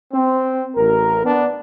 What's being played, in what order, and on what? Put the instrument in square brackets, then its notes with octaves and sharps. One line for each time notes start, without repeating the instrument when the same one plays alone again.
[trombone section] C4
A1 A#4
B3 D4